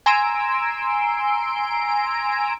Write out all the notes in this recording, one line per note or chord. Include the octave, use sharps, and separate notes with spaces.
G#5 A#5 C6 E6 D7